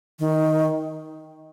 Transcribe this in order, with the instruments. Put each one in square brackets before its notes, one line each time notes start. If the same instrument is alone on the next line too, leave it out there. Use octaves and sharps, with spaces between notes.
[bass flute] D#3